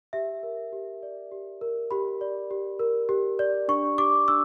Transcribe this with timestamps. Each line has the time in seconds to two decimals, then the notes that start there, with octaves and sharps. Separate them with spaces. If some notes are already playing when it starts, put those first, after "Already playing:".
0.13 G4 E5
0.43 A#4
0.72 G4
1.03 D5
1.31 G4
1.61 A#4
1.91 G4 B5
2.21 D5
2.51 G4
2.79 A#4
3.09 G4
3.39 D5
3.68 D4 C#6
3.98 G4 D6
4.28 D4 E6